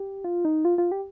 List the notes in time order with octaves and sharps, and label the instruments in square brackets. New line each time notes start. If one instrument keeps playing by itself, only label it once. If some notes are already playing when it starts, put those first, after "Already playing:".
Already playing: [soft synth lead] G4
F4
D#4
F4
F4
G4